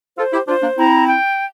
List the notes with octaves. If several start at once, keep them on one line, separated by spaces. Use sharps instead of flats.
F4 A4 C5
E4 G4
D4 F4 C5
A#3 D4
C4 E4 A#5
G5